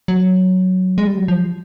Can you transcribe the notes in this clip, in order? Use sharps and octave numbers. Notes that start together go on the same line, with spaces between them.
F#3
G#3
G3
F#3
F3